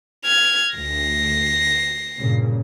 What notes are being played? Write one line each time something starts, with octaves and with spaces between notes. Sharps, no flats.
F6 G#6
D2 A#6 C7
G2 A#2 C#3